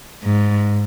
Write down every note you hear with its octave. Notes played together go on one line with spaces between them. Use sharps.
G#2